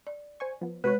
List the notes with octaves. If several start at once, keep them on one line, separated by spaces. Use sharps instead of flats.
D5
C5 G#5 C#6
F3 B3
C3 G#3 F#4 B4 C#5